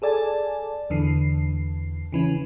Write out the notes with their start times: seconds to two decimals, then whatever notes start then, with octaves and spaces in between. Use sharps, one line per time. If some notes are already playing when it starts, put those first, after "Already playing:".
0.02 G#4 A4 D5 G#5 A5
0.90 E2 D3 E3 C7
2.12 C#3 E3 C#4